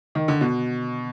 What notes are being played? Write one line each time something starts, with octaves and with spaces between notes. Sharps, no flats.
D#3
D3
B2